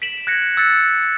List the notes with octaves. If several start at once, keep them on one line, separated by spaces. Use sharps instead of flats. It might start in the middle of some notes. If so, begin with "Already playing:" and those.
B6 D7 E7 F#7
F#6 G#6 A#6 C#7
E6 F#6 A6 C#7